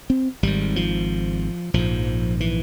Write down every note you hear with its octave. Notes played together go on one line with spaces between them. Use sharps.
C4
G#1 G#2 G3
F3
A#1 G#2 F3
E3